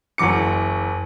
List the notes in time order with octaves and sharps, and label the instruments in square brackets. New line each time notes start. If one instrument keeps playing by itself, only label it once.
[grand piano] F#1 E3 F#3 D6 C#7